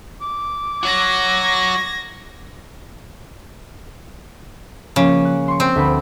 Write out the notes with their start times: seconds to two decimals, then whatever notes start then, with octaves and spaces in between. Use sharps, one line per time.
0.21 D6
0.84 F#3 F#4 G#6 A#6
4.96 C#3 F3 A#3
5.25 F#6
5.48 C6 C#6
5.60 C4
5.76 D2 B4 B5